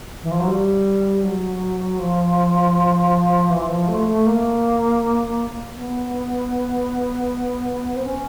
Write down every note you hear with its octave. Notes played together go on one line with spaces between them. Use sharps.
E3
F3
F#3
G3
F#3
F3
E3
F3
A3
A3
A#3
B3
C4
C#4